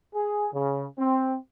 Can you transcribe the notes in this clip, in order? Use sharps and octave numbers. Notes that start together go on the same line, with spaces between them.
G#4
C#3
C4